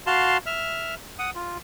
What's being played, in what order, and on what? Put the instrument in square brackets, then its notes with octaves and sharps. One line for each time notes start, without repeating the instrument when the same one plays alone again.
[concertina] F#4 F5 A5 C6
E5 F6
F#5 D#6
F4